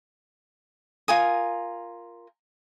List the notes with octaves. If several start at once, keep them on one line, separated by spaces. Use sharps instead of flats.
F4 A#4 G#5 D#6